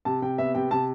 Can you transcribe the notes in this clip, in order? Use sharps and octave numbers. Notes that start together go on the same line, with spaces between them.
C3 A5
C3 G5
B3 E5
C3 G5
C3 A5